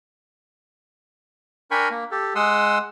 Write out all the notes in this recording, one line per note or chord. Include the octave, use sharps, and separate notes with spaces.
D4 A#4 G5 G#5 B5 C#6
A#3
G4 A4
G#3 F#5 C6 D#6 E6